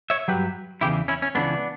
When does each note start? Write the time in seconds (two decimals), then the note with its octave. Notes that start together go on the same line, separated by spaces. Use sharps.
0.10 C#5 E5
0.28 G2 F#3 G4 B4
0.81 E2 C#3 E3 E4 G4
1.08 C#4 E4
1.22 C#4
1.35 C#2 C#3 E3 B3 D4